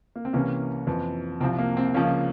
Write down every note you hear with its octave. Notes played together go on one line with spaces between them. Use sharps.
A#3
C4
C2 C3 E3 A#3 C#4
F2 E3
C2 C3 F3 C4
A#3
C4
C#2 C#3 F3 A#3 C#4